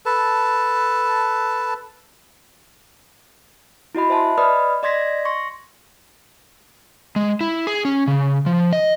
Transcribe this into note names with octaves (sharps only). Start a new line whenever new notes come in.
A4 B4 A5
E4 F#4 D#5 B5
C5 E5 G#5 A5 B5 C6
B4 D5 D#5 B5 D#6 F6
D5 D#5 C6 G#6 A#6 B6
C6 C#6 A#6 C#7
G#3
E4
G#4
C#4
C#3
F3
D#5